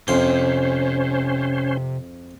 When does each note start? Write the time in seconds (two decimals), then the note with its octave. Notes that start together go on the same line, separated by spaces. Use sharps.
0.08 F2 C3 C#4 C5 C6